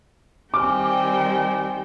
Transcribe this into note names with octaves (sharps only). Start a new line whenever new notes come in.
D#3 G3 C4 G5 G#5 D6 F6